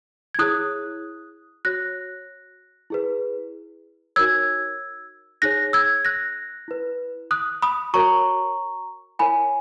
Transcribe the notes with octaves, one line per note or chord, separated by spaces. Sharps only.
G#6
E4 G#4 C#5 D#6 F#6
F#4 C#5 F#6 A#6
E4 G#4 B4
D#4 F#4 A#4 C#5 E6 G#6
D#4 G#4 C#5 F#6 A#6
E6 G#6
F#6 A#6
E4 B4
D#6 F#6
B5 D#6
F#4 A#4 C#5 A#5 C#6
E4 A#4 C#5 G#5 B5